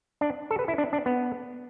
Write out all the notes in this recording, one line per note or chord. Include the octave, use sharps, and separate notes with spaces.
D4
A4
B4
E4
D4
D4
B3